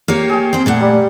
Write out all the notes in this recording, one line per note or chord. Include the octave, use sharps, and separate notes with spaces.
A#3 G4 C#5 F5
G#4 G5
C4 C5
A#2 A3 F#5
G3